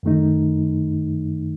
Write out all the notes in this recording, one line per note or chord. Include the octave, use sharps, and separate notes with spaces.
F#2 D#3 A3 D#4